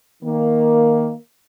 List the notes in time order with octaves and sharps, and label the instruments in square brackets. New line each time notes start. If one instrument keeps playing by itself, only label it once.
[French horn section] D#3 A#3